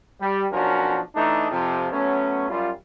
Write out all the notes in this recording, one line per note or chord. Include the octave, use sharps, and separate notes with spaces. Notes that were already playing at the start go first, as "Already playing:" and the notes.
G3
B1 F3 C#4 D4 F#4 A#4
E3 A3 D4 D#4
F2 C3 F3
F#3 A3 B3 C#4
F#2 G3 F4